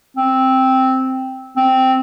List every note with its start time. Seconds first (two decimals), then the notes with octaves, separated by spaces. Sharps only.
0.17 C4
1.57 C4